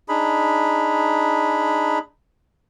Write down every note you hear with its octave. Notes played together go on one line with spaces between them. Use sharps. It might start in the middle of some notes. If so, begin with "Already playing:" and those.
D4 D#4 G#4 B5